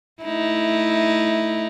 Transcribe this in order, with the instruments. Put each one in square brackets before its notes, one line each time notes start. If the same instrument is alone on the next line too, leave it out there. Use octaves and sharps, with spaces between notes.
[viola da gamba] A3 D#4 E4